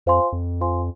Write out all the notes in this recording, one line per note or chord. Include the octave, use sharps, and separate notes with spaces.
F2 F4 C5 F5 G#5 C6
F2
F4 C5 F5 G#5 C6